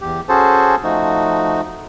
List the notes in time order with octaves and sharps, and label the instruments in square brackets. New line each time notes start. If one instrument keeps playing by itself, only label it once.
[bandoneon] E2 G4
C#4 F#4 G#4 A4 C5 A5
F3 A3 D#4 F#4